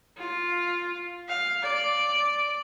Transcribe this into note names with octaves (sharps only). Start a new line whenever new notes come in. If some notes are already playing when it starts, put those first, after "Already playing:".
F4
F5
D5